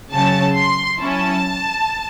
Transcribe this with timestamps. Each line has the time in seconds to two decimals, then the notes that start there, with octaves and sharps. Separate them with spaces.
0.12 C#3 F#3 C#4 A5
0.56 C6
1.00 F#3 C#4 E4 A5